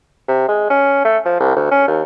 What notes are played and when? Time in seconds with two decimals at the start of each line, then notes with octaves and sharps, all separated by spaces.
0.28 C3
0.49 G#3
0.70 C#4
1.05 A3
1.25 F3
1.40 C2
1.56 D2
1.71 C#4
1.88 D#2